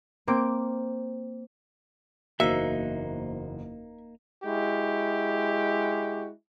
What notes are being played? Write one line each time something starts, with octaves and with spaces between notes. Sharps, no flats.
A#3 C4 D6 D7
F#1 E2 A#3 D#4 F#4 C5 E5
G#3 E4 F#4 G4